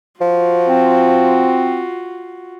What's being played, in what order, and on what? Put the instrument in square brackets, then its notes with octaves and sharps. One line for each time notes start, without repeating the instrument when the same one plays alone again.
[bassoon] F3 [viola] F4 F#4
[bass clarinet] C4